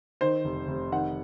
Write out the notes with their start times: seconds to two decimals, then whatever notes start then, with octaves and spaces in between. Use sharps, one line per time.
0.21 D#3 C5
0.45 F1
0.68 F1
0.92 D#3 F#5